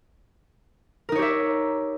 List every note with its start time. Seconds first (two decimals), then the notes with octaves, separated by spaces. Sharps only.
1.09 A#4
1.12 D#4
1.15 C#5
1.19 G4
1.22 E5